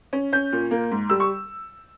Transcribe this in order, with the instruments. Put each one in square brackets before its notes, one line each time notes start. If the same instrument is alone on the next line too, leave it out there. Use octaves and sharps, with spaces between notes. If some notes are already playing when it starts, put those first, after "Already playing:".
[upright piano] C#4
C#4 G6
A#2
A#3
G#2
G3 E6
C#6